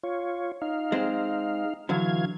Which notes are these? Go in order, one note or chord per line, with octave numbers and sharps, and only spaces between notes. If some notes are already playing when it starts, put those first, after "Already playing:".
F4 C#5
D#4 F5
G#3 C4
D3 E3 F#3 F5 G#6